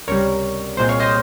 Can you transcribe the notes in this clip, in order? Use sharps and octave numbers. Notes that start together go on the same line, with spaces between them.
C#2 C3 G3 A#4 C#5
C2 A#2 G#3 C4 C5
C#5 F5
C5 D#5